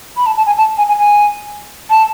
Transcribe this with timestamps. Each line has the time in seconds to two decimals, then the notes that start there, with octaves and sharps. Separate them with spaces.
0.17 B5
0.26 A5
0.37 A5
0.46 G#5
0.57 A5
0.78 G#5
0.88 G#5
0.98 G#5
1.90 A5